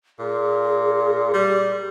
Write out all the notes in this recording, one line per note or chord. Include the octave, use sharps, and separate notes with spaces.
A#2 G#4
G3